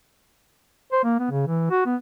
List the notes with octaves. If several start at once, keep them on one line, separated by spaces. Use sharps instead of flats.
C5
A#3
B3
C#3
E3
F#4
B3